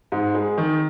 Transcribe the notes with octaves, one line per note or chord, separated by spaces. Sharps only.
G#2
G#3
D#3